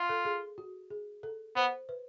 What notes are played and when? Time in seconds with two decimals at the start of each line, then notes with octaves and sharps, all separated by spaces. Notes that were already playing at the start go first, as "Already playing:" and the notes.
Already playing: F4
0.09 A4
0.25 G#4
0.58 F#4
0.90 G#4
1.23 A4
1.56 B3 C5
1.89 B4